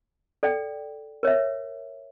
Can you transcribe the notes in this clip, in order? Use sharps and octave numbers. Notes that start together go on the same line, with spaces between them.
A4 D5 G5
A#4 C#5 E5